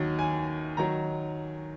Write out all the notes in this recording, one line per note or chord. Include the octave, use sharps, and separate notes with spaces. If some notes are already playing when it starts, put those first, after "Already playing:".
Already playing: D#2 D#3 F#3
G#5
D#3 F#3 A#5